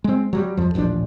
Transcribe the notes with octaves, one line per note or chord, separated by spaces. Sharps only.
G#3 C4
F#3 G3
F2 F3
D#1 A1 F3 D4